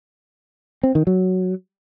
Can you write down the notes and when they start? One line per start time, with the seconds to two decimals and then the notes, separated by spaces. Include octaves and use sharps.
0.83 C4
0.95 D#3
1.07 F#3